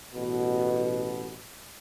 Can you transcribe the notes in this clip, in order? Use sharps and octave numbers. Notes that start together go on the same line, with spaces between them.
A1 B2